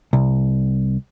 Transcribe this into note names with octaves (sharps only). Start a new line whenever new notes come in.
C2